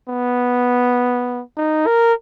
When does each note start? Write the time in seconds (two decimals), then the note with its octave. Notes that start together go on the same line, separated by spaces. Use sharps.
0.09 B3
1.57 D#4
1.86 A#4